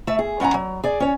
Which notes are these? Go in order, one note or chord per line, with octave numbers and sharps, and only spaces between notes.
A3 E5
G#4
G2 C#4 F#5 G#5 A#5
F#3
G#4 D5
C#4 C#5